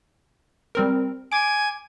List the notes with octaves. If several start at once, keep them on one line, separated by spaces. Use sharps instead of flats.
G3 C4 A#4
G#5 D6 D7